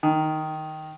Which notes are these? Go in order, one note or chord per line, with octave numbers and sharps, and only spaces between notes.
D#3